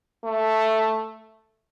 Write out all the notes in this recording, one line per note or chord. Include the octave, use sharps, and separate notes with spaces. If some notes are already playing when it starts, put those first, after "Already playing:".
A3